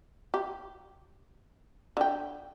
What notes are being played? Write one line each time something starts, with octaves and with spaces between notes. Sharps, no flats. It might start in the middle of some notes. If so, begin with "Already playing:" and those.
G4
D3 G5